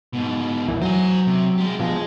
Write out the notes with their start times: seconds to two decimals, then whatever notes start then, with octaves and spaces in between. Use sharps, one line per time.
0.13 G#2 B2
0.68 E2 A#2 E3
0.82 F#3 C5 G#5
1.27 C3
1.58 G#3 G4
1.80 B2 F3 G#3